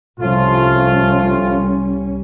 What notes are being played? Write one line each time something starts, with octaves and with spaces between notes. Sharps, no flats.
C2 F3 G3 A3 C#4 F4